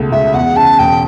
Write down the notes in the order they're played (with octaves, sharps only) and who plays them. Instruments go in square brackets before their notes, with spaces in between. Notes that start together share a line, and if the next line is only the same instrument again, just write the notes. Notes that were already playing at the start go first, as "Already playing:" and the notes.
Already playing: [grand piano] C#2 B2 A3
[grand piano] C#2 [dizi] E5
[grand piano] E2 [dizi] F#5
[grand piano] C#3 [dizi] A5
[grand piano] E1 [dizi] G5